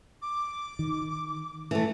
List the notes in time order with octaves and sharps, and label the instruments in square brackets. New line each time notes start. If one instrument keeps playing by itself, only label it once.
[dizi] D6
[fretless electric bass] D#3
[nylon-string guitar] E3 A3